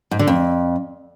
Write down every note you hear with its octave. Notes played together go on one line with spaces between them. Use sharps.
G#2
D3
F2